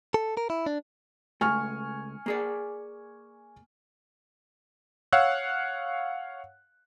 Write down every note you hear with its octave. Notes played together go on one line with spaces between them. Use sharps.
A4
A#4
E4
D4
C#2 A3 G#5 C#6 F6
A#3 G#4 D5
C#5 F5 F#5 E6 F#6